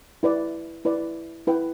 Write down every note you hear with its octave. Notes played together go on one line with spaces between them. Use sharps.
E4 B4 D5
E4 B4 D5
E4 B4 G5